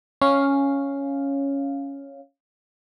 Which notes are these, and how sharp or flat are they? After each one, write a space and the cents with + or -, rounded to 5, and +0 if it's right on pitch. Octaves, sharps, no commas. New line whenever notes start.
C#4 +0 F5 +0